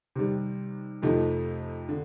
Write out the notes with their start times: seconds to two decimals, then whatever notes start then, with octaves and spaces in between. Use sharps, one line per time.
0.16 C3 D#3 G3
1.02 F2 C3 F3 A3 D#4
1.89 D3